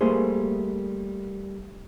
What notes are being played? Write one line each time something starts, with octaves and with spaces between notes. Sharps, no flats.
G3 A3 A#3 G#4 C5